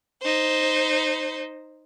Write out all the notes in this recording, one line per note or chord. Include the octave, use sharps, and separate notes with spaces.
D#4 C5